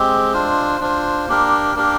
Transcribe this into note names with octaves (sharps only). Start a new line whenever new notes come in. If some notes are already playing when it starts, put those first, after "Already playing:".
Already playing: G#3 C4 G4
D4 F4 C5
D4 F4 C5
A#3 D4 G4 A#4
A#3 D4 G4 A#4